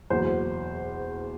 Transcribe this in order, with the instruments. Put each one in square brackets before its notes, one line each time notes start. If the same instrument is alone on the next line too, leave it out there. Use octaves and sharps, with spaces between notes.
[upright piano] F#1 E2 B2 C5